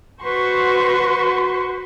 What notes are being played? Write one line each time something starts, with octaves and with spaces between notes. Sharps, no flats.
F#4 B4 C5 C6 C#6